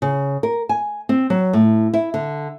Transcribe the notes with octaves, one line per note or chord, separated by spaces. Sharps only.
C#3
A#4
G#5
C4
F#3
A2
E4
D3